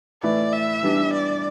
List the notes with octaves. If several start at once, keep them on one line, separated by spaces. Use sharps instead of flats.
A2 E3 A3 E4 B4 D5
E5
E3 G3 B3 D4
D5